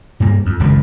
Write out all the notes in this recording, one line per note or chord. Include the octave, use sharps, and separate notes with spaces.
G2 A#3
F2
G#1 C#2 F#2 A2